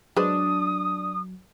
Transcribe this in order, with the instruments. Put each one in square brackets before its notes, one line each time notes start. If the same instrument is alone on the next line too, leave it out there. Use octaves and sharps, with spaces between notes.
[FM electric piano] F#3 [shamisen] G#3 B4 C5 [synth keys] D4 [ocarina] D#6